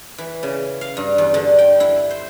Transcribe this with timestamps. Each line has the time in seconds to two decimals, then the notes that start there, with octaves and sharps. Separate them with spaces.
0.18 E3
0.43 C#3
0.81 F5
0.97 G2
1.18 E2
1.34 D3
1.59 G5
1.80 E4
2.11 C5